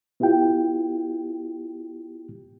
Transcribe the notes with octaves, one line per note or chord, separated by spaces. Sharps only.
B3 E4 F4 G4 G5